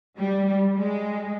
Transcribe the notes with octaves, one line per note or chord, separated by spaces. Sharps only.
G3
G#3